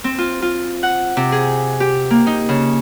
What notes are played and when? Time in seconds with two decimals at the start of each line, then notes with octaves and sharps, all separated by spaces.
0.04 C4
0.18 F4
0.42 F4
0.83 F#5
1.17 C3
1.32 G#4
1.80 G4
2.11 A#3
2.27 D#4
2.49 C#3